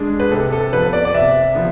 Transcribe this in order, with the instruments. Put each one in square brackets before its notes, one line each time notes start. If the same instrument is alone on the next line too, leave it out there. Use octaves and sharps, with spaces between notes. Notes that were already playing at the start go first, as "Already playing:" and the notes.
Already playing: [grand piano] G#3 D4
B4
C3 A4
A4
F3 B3 B4
D5
D5
C3 E5
F3 B3